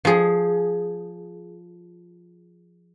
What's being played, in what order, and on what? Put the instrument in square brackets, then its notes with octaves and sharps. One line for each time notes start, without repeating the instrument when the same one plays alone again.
[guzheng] F3 G#4